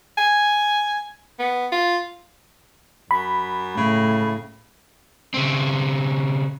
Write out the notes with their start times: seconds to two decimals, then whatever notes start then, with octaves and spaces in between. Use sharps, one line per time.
0.18 G#5
1.39 B3
1.72 F4
3.11 F#2 B5
3.77 A2 C#3
5.34 C#3 C4